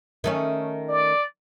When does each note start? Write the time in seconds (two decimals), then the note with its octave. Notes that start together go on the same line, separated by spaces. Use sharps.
0.24 D#3 A3 C#4
0.88 D5